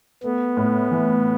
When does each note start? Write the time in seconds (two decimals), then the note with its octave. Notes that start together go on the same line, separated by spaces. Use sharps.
0.23 A3 B3
0.57 A2
0.91 E3